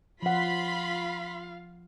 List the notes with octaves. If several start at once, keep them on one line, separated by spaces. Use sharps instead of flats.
F3 F4 F5 F#5 B5 C6 B6